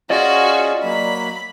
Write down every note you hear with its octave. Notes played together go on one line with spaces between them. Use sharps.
C#4 F4 F#4 G#4 D5 D#5
F#3 A#3 B5